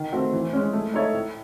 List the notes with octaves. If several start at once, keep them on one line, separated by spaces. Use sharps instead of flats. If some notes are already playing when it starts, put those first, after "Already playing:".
Already playing: D#3
A3 C4 F#4
E3
G#3 C#4
A3
D#4 A4 C#5 E5
A2